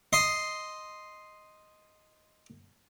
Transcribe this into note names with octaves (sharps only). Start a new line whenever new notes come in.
D#5 C6